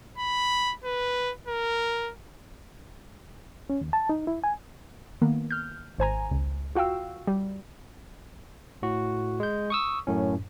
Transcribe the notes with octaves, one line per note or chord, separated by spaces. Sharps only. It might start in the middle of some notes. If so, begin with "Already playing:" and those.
B5
B4
A#4
C#4
D#2
A5
D#4
E4
G#5
D#3 A#3 B3
F6 G6
G#1 C5 G#5 A#5
C#2
F4 F#4 F5 G5 E6
G3
A2 F#4
G#3 G6
C#6 D#6 E6
F#2 A2 C#4